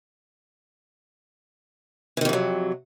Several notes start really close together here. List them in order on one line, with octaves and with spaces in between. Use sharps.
E3 D#3 F2 C3 F#3